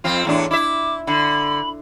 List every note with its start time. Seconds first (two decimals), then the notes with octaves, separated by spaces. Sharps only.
0.04 F2 C4 F4
0.25 E2 A2 D4
0.51 E4 E5 D6
1.07 D3 B5